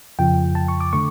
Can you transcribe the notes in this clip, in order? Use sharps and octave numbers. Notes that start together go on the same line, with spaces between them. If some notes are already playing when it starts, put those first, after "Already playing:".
F2 C#3 F3 G5
A5
C#6
D6
D3 A3 C#6